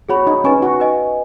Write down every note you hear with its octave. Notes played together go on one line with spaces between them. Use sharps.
F#4 G#4 C#5 B5
D#4
C#4 D#4 B4 G#5 C#6
F#4
B4 D#5 G#5